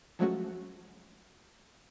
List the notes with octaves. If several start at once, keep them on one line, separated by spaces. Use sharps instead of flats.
F3 F#3 G#3 A3 C#4 F#4